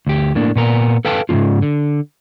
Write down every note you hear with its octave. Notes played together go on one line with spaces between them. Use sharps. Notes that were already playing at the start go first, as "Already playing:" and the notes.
D2 G4
A2 A#3 D4
A#2 B3 A#4
A4 B4 F5 G5 A5
G#2 C#3 E3 C4 F4
D3